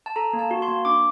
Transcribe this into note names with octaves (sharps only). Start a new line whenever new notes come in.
A5
A4 A#5
A#3
A5
F#4
C6
A#3
D4 D6